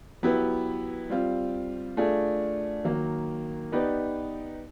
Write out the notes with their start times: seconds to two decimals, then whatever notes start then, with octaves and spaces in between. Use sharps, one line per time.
0.23 F#3 B3 E4 G4 B4
1.10 G3 C4 F4
1.97 A3 D4 F4 G#4
2.84 D#3 F#3 A#3
3.72 B3 D#4 G4 B4 D5